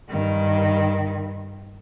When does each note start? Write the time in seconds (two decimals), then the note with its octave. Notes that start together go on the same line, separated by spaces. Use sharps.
0.10 G2 D#3